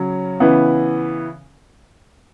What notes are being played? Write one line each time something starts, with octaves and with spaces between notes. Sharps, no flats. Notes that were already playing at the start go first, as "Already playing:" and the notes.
Already playing: C#3 F#3 C#4
C#3 E3 B3